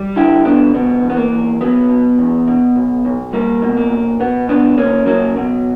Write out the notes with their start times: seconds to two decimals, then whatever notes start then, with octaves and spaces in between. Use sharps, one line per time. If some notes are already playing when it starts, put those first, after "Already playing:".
Already playing: G3
0.16 D3 E4 G4
0.45 D2 B3 D4
0.74 B2 B3
1.03 E2
1.10 B3
1.17 A#3
1.32 E2
1.61 F#3 B3
1.90 B2
2.18 E2
2.47 B2
2.76 B1
3.05 B1
3.33 G3 A#3
3.62 B2
3.77 A#3
3.92 B1
4.20 B2 B3
4.49 C#2 B3 D4
4.77 C#2 A#3 C#4
5.06 F#3 A#3 C#4
5.36 B2